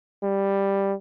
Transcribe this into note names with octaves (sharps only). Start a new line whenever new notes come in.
G3